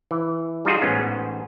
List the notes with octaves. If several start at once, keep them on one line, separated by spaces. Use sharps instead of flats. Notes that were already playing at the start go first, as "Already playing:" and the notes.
E3
G3 D#4 F4 F#4 G#4
A1 G#2 B3 C#4